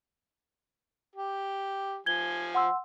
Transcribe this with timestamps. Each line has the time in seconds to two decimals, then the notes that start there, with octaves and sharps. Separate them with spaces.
1.16 G4
2.06 F3 G#5 G#6 G7
2.55 F#5 C6 E6